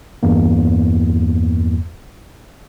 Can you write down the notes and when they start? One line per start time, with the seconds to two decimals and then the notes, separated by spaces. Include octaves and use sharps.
0.23 E2 G2 A#3